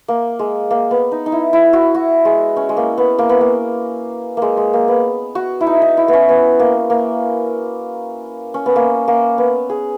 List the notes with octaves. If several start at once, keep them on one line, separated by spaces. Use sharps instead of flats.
A#3
G#3
A#3
B3
D#4
D#4
E4
E4
F#4
F#4
G#3
C#4
G#3
A#3
B3
A#3
B3
A#3
G#3 A#3
G#3
A#3
B3
F#4
E4
D#4
D#4
E4
B3
C#4
B3
A#3
A#3
C#4
B3
A#3
A#3
B3
G#4